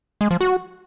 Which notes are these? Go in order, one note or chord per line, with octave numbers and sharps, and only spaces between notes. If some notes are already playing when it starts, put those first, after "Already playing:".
G#3
F3
F#4